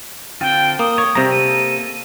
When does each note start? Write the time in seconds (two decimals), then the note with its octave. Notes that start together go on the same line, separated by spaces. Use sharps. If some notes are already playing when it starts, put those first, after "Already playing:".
0.41 D3 C4 F4 G5
0.79 A#3 D#6
0.98 C#5
1.15 C3 G3 C4 A#5
1.32 A#3 A4 D#7